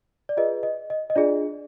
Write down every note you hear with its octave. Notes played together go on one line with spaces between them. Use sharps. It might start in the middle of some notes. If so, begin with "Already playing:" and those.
D5
F4 G#4 B4 D#5
D#5
D#5
D#5
D4 F4 G#4 D5